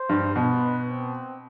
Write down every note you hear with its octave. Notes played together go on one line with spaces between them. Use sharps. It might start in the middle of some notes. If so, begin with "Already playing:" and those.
Already playing: C5
G2
B2 B4
C4